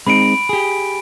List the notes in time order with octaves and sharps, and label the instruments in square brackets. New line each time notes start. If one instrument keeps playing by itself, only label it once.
[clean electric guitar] G#3 C4 D#4 [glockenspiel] B5 D7
[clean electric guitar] G4 G#4